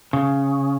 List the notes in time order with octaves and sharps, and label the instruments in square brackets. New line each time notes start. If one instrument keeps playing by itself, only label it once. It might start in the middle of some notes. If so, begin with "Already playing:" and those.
[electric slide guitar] C#3